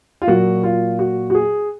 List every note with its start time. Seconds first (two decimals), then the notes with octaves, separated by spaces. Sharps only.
0.22 F4
0.27 A#2 F#3 A#3 F#4
0.63 F4
0.99 F#4
1.30 F#4
1.34 G#4